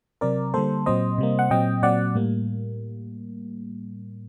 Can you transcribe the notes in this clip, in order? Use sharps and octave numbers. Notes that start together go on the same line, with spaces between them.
C3 F#3 C4 A#4 D5
D3 G3 A#3 A4 C5
A#2 F#3 C4 C5 D#5
C3 G3 A#3
F#5
A#2 F#3 C4 D#5 G5
A#2 F#3 C4 D5 F#5
A2 G3 A#3